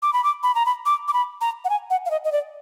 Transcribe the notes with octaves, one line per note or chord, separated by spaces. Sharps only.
D6
B5
D6
B5
A#5
B5
D6
D6
B5
A#5
F#5
G#5
F#5
F5
D#5
D#5
D5